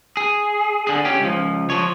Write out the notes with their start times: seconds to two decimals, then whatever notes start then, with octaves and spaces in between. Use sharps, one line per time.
0.17 G#4
0.87 D3 G#4
1.05 C#4 G4
1.20 C#2 F3
1.70 F3 C#5